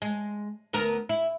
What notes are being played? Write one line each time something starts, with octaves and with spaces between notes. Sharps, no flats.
G#3
D2 B3 A#4
E4